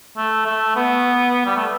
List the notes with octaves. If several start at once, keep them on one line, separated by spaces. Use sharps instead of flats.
A3
A3
B3
G3
A3